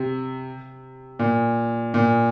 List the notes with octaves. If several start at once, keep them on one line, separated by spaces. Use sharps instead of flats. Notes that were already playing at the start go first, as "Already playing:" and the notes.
Already playing: C3
A#2
A#2